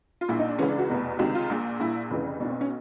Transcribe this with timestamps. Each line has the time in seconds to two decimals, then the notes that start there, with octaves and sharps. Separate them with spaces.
0.21 F4
0.29 A#1 A#2 E4
0.39 D#4
0.48 D4
0.59 C#2 C#3 E3 C#4
0.69 D4
0.79 F#4
0.90 F1 E2 B2
1.19 C#2 C3 D#3 F#4
1.35 F4
1.49 A#1 A#2
1.79 A#1 A#2 E4
2.10 F1 F2 C#3 E3
2.40 B2 D4
2.45 B1
2.50 C4
2.61 C#4